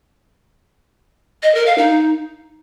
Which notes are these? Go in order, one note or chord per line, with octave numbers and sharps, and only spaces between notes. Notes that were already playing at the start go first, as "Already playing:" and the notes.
D#5
A#4
F5
D#4